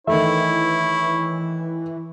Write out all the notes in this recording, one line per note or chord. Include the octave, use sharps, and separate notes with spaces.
D#3 E3 A3 E4 C#5 E5